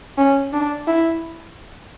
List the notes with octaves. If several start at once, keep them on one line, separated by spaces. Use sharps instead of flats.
C#4
D4
E4